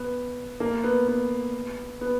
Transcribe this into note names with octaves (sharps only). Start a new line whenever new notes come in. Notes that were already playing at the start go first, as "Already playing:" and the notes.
Already playing: B3
A#3
B3
B3
B3